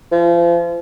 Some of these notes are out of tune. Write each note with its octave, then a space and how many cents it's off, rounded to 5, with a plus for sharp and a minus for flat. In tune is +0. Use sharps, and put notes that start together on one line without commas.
F3 -35